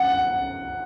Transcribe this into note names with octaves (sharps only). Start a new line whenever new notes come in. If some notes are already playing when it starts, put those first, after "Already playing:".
Already playing: F#5